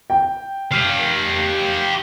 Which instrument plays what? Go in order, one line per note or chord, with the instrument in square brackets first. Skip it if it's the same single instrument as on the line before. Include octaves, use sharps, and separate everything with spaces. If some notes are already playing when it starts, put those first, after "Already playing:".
[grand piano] G5
[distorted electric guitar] G4 F5